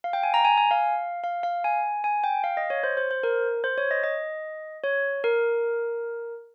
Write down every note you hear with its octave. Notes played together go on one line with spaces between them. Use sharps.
F5
G5
G#5
A#5
G#5
G#5
F5
F5
F5
G#5
G#5
G5
F5
D#5
C#5
C5
C5
C5
A#4
C5
C#5
D#5
D#5
C#5
A#4